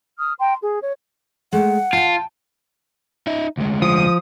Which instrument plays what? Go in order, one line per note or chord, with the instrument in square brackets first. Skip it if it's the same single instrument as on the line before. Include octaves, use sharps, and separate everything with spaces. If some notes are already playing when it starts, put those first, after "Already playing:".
[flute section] D#6 F6
G5 A#5 C6
G#4
C#5
[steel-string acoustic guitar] G#3 A3 [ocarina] F#5
[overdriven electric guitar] F4 [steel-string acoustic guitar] G5 A5
[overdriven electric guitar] D#4 E5
D2 G#3
[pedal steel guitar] F3 [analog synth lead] D#6